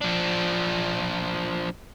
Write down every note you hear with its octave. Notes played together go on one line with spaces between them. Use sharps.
F3 D4